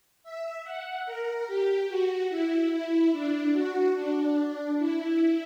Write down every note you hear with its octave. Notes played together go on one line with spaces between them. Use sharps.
E5
F#5
A#4
G4
F#4
E4
E4
D4
F#4
D4
E4